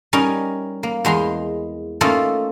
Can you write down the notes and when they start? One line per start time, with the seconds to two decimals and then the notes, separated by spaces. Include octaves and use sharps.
0.13 G3 C#4 D#4 A#4
0.83 A#3
1.05 E2 G#3 A#5 C6
2.01 A3 A#3 C#4 D#4 F4 A4